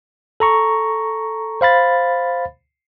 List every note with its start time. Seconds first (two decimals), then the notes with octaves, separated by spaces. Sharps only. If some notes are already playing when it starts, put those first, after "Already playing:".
0.40 A4 A#5 C#6
1.61 C5 F5 B5 A6